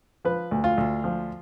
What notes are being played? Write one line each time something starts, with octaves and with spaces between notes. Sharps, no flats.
F3 B4
D2
F4
D2
F3